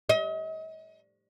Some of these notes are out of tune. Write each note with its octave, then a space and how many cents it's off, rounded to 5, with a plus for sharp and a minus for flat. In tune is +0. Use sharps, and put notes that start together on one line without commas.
D#5 +40